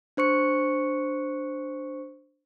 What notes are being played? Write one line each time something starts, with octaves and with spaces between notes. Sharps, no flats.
D4 C5 C#6 C#7